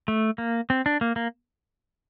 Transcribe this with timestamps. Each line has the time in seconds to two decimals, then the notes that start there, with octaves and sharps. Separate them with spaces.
0.08 A3
0.38 A#3
0.70 C4
0.86 D4
1.01 A#3
1.16 A#3